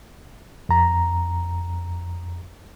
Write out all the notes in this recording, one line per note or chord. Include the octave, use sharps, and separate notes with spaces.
F2 A#5